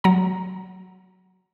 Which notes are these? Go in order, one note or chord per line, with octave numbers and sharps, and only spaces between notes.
F#3 A#5